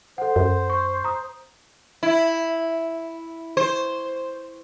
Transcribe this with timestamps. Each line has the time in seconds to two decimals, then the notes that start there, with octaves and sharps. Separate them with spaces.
0.18 A4 C5 F#5
0.36 F#2
0.70 C#6
1.04 A#5 D#6
2.03 E4
3.57 C5